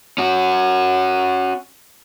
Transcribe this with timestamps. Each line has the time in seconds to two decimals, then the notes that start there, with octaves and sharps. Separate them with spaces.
0.18 C#4 F#4